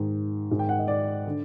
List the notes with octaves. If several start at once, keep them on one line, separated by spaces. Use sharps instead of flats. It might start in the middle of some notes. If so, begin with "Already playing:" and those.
Already playing: G#2 D#3
G#2 D#3
G5
F#5
D#5
D5
D3